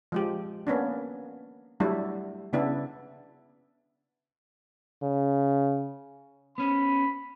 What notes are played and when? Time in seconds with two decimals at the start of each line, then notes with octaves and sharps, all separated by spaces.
0.12 F3 G#3 G4
0.67 A#3 B3 C#4 D4
1.80 F#3 G3 A3 D4 E4
2.53 C#3 B3 D4 E4
5.03 C#3
6.58 B3 C#4 B5